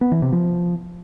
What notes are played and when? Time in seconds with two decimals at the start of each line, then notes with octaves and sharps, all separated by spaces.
0.01 B3
0.12 E3
0.22 C3
0.32 F3